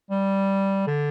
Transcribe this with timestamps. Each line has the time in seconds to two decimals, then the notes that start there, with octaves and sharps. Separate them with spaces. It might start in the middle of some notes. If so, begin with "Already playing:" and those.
0.10 G3
0.87 D3